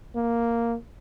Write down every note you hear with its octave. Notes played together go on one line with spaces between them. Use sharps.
A#3